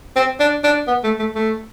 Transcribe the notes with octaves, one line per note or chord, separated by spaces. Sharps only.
C4
D4
D4
B3
A3
A3
A3